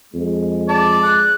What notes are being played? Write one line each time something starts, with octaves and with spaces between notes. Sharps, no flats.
F2 G#3
D5 A5
F#6